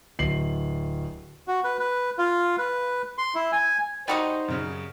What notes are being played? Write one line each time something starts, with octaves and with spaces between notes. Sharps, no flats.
D1 C7 F#7
F#4
B4
B4
F4
B4
C6
E4
G#5
G3 D#4 F#4 C5 D#5
F#2 C#3 C#4